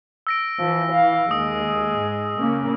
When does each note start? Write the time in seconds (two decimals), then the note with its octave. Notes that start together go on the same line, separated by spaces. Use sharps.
0.27 E6 A#6 D7
0.59 E3 F3
0.92 F5
1.31 D#2 G#3 D#6
1.96 G#2
2.37 C#3 A#3 C#4